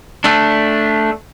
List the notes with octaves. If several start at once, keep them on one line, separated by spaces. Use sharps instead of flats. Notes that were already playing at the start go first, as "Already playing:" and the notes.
A3 D4